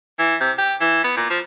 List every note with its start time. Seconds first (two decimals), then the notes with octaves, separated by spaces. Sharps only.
0.19 E3
0.41 C3
0.58 G4
0.80 E3
1.04 B3
1.17 A#2
1.30 F3